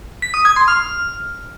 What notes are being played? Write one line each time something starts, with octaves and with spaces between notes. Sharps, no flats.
B6
D#6
G#6
C6
F6